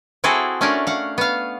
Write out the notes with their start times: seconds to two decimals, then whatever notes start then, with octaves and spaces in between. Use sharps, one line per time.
0.24 C4 E4 F#4 G#4 A4
0.61 A3 C#4 D4 A#4 C#5 D5
0.87 F5 F#5
1.18 B3 F5